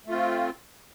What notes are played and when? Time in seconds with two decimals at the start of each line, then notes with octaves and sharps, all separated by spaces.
0.06 A3
0.09 F4
0.12 C4